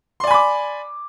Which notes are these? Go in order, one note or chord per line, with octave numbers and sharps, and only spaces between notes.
D5 G#5 B5 C6 D6